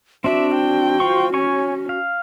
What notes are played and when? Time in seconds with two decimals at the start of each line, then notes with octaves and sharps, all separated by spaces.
0.24 C4 D4 F#4 D5 E5
0.55 G5
1.00 F4 C5 C#6
1.34 C#4 C#5 G#5 C#6
1.89 F5